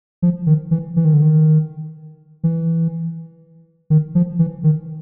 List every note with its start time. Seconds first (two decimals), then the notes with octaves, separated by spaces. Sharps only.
0.22 F3
0.47 D#3
0.71 E3
0.96 E3
1.05 D#3
1.13 D3
1.22 D#3
2.44 E3
3.90 D#3
4.15 F3
4.39 E3
4.64 D#3